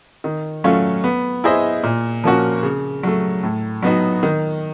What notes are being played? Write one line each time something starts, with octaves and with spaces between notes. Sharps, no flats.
D#3
F#3 A3 C#4 F4
B3
E4 G#4 C5 D#5
A#2
F3 A#3 C#4 F#4
C#3
F#3 A3
A2
F#3 B3 D#4 F#4
D#3